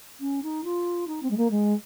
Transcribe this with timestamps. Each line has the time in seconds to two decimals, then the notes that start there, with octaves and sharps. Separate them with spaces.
0.20 C#4
0.43 D#4
0.64 F4
1.07 D#4
1.23 C4
1.30 G#3
1.37 A#3
1.50 G#3